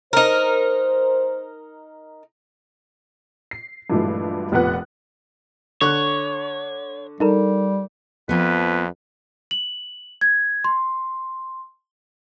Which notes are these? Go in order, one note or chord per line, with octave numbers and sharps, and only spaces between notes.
D#4 A#4 C5
C7
G2 A#2 E3 F#3 G#3 A3
F1 A#2 B3 B4 F#5 F#6
D3 C#5 C#6 F#6
G3 D#4 A4 A#4
F2 F3 B3 B4
F#7
G#6
C6